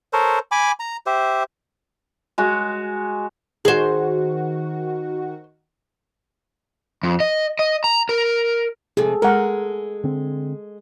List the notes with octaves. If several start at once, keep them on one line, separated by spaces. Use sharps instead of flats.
A4 A#4 C5 C#5
G#5 B5 D6
A#5
G4 C5 E5
G#3 F#4
D#3 F#4 G#4 C5
F2
D#5
D#5
A#5
A#4
F2 C3 G#4 A4
G#3 A#4 F#5
D3 C4